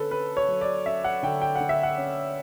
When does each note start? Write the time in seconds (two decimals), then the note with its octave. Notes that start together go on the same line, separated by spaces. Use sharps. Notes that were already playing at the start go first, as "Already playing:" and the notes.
Already playing: D3 C#4 A4 B4
0.11 C#4 B4
0.37 C#5
0.48 F#3
0.61 D5
0.86 C#4 E5
1.04 F#5
1.23 D3 G5
1.42 G5
1.55 D3 F#5
1.69 E5
1.83 F#5
1.98 C#4